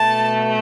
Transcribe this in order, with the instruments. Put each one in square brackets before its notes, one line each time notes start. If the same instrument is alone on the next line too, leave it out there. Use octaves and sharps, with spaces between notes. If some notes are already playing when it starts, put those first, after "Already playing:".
Already playing: [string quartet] B2 A3 A5